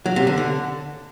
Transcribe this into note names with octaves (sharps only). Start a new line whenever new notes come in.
F#3
C3
D3
D3